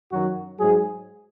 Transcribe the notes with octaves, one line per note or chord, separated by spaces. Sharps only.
F#2 D#3 F#3 F#4
G#2 F#3 G#4